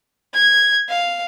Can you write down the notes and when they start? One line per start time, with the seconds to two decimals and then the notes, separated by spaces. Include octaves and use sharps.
0.34 G#6
0.89 F5